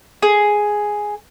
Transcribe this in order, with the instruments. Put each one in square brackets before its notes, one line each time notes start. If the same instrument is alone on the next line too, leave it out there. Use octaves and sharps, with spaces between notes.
[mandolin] G#4